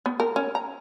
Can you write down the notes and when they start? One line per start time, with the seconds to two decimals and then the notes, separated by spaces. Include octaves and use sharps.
0.06 B3
0.20 A#4
0.36 C#4
0.55 A#5